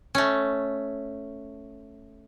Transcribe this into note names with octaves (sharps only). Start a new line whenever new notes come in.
A3 C#4